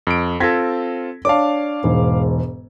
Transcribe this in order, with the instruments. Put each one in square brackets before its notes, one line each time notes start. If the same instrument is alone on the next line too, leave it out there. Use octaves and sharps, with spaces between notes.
[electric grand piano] F2 D7
[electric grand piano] C4 F4 A4 [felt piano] G#6 A#6 B6
[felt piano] D4 C#5 A5 [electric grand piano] F5 D6
[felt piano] E1 G#2